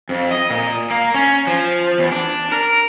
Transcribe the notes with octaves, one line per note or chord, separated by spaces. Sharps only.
F2
D#5
A#2
A#3
C#4
F3
E2
D4
A#4